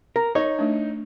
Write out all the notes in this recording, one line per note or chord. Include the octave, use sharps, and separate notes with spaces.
A#4
D#4 C#5
A3 D4